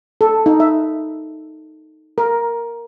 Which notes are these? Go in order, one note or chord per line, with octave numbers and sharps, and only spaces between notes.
A4
D#4
E5
A#4